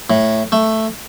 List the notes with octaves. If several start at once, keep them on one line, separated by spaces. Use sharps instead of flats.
A2
A3